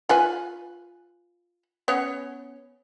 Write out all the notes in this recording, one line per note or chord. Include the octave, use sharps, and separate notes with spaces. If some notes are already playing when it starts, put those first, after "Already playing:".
F4 B4 G#5
B3 C#4 C#5